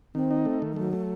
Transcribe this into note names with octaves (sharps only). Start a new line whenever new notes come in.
D#3 C4
D#4
A3
D#3
G3
F#3 A3
A3